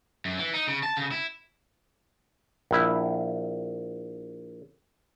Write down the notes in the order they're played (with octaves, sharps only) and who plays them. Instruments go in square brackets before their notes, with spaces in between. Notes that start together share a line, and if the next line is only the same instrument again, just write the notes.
[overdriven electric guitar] F#2
E3
D#4
C#3
A5
C#3
E4
[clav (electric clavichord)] A#1 E4